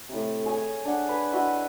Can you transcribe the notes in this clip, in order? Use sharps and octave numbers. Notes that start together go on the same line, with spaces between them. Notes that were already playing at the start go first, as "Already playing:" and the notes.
A2 C3
G#4 C#5 G#5
D4 F#5
B4
E4 F#4 D#5